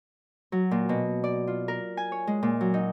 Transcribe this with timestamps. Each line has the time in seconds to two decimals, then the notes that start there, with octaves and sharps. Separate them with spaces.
0.52 F#3
0.71 A#2
0.89 B2
1.24 D5
1.47 F4
1.68 A#4
1.97 G#5
2.12 C#5
2.27 G#3
2.43 A#2
2.61 F#3
2.74 D#4